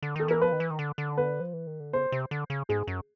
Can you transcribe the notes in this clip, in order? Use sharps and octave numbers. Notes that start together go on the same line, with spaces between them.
D3
D#3 A4
E3 A#4
F3 B4
D#3
E3
D#3
D3
D3
B4
F3
E3
D#3
D3
C#3 C5
C3
D3
C#3
G#2 G#4
F#2